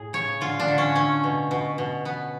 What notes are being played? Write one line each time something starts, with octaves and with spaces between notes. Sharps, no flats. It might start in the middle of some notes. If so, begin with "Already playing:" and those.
Already playing: A2 G#4
C#3 C#5
D3 F4
D4
D3
C#4
A3 C#4
B2
B2
B2
B3